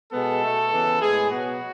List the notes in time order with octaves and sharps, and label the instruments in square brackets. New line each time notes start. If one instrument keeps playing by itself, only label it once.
[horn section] B2 G#3 B3 A4
B2 A3
C#3 E3 B3
A2 G#3 B3 G#4
B2 F#3 B3 F#4